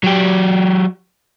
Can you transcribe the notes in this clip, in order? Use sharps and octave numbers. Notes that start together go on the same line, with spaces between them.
F#3 G4